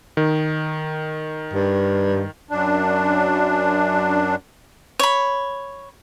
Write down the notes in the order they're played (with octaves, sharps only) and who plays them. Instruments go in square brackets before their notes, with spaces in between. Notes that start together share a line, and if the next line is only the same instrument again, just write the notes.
[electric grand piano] D#3
[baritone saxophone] G2
[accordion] F#2 D4
[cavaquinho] C#5 B5